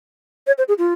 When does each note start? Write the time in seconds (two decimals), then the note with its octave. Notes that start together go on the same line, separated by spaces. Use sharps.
0.47 C#5
0.58 C5
0.68 G#4
0.79 F4